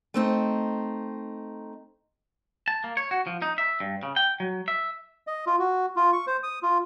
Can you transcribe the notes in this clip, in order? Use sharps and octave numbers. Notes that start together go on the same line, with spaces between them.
A3 C4 D#4
A5
A#3
C#5
F#4
F3
D#4
E5
G2
C#3
G5
F#3
E5
D#5
F4
F#4
F4
C#6
C5
D#6
F4